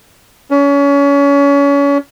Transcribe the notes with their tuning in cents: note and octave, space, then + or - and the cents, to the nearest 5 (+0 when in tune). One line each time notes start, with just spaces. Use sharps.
C#4 +30